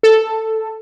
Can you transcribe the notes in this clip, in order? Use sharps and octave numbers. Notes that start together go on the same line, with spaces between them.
A4